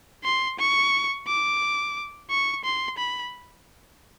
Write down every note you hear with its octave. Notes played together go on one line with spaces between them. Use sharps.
C6
C#6
D6
C#6
C6
B5